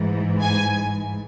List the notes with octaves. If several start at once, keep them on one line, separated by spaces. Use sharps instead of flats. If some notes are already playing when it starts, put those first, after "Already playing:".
Already playing: G#2 E3
G#5